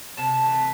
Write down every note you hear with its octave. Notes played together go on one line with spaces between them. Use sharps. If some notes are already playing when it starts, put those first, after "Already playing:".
C3 A5
E3 A3